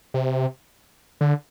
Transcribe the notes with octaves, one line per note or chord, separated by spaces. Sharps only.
C3
D3